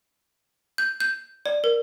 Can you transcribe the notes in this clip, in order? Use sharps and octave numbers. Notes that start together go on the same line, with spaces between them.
G6
G6
D5
A#4